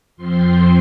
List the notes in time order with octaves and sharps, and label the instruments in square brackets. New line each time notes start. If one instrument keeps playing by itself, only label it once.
[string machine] F2 F3 C4 C6